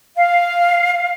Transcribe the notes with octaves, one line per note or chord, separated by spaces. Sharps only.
F5